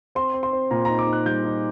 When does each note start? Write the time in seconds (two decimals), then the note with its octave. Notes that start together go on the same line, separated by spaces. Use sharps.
0.15 C4 C6
0.34 C4
0.43 C6
0.53 C4
0.71 A#2 A#5
0.85 D#4 A#5
0.99 D6
1.07 D#4
1.13 F#6
1.26 G3 G6
1.44 D#4